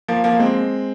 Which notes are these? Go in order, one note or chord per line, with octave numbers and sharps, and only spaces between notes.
F3 A#3
F3 A#3
G#3 C4